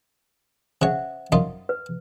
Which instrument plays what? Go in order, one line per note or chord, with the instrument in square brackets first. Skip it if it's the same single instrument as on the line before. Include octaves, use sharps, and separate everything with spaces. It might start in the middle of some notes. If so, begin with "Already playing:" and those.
[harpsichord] C#3 C#5 [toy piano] C5 E5 F#5
[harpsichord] F#2 D#4 F4
[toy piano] B4